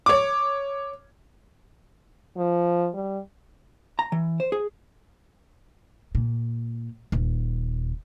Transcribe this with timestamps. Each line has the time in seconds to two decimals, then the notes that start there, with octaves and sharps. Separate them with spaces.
0.06 C#5 D6
2.37 F3
2.94 G3
3.99 A#5
4.12 E3
4.40 C5
4.52 G#4
6.15 A#2
7.12 D#1